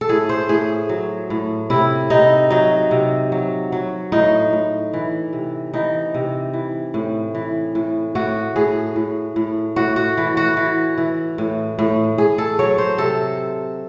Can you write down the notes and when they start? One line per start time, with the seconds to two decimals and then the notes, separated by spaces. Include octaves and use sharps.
0.01 A4
0.09 A2 G#4
0.29 C5
0.49 A2 G#4
0.89 F#3
1.30 A2
1.70 C3 E4
2.10 C3 D#4
2.50 F#3 D#4
2.91 C3
3.32 F#3
3.72 F#3
4.12 A2 D#4
4.53 A2
4.93 E3
5.33 C3
5.74 E3 D#4
6.14 C3
6.54 E3
6.94 A2
7.35 E3
7.75 A2
8.15 A2 F#4
8.56 A2 G#4
8.96 A2
9.36 A2
9.76 A2 F#4
9.96 F#4
10.17 E3
10.37 F#4
10.57 E3
10.98 E3
11.38 A2
11.79 A2
12.18 A2 G#4
12.38 A4
12.59 F#3 C#5
12.78 C5
12.98 C3 A4